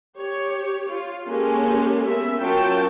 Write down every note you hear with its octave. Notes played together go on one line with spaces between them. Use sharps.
G4 C#5
F4
G#3 A#3 C#4 G4 A4
B3 A#4 E5
F#3 C#4 F4 A#4 G5 A5